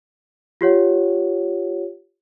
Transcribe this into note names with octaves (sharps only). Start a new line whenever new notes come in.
F4 G4 C#5 F#5